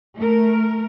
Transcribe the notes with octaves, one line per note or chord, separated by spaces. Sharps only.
A3 A#4